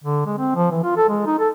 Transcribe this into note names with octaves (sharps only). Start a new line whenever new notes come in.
D3
G#3
C4
F3
E3
F4
A4
G#3
D#4
A4